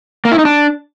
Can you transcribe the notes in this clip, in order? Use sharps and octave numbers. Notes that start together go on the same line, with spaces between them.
A#3
E4
D#4
D4